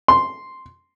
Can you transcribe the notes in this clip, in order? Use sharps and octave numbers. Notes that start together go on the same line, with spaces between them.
C6